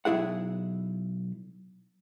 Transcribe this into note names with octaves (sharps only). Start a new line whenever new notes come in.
B1 C3 E4 G#4 F#5